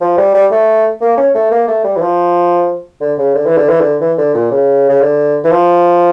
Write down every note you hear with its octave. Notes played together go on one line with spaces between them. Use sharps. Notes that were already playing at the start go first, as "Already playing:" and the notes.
F3
G3
G3
A3
A#3
C#4
A3
A#3
A3
G3
E3
F3
D3
C#3
D3
E3
D3
E3
D3
E3
D3
A#2
C#3
C#3
D3
E3
F3